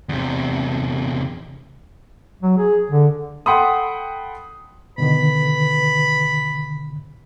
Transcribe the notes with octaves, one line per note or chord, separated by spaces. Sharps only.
E2 C3
F#3
G#4
D3
A4 F#5 G5 B5 C6 D#6
B2 D3 D#3 B4 B5